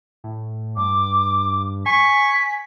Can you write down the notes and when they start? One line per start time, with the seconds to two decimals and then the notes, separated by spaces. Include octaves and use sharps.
0.24 A2
0.77 G2 D6
1.86 G#5 C#6 B6